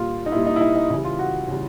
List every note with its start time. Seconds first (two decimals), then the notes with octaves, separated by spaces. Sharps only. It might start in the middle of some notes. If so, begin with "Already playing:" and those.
Already playing: A#2 G3 F4
0.26 D#4
0.32 A#2 G3 E4
0.47 D#4
0.56 E4
0.61 D#4
0.76 D#4
0.90 C#3 E3 G3 E4
1.05 F4
1.19 F#4
1.48 C#3 E3 G3